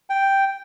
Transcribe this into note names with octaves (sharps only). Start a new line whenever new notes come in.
G5